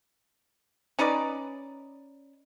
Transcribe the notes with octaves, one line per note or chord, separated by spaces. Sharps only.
C#4 D#4 B4 D5